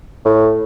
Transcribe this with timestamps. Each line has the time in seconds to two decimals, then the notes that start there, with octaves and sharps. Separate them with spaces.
0.25 A2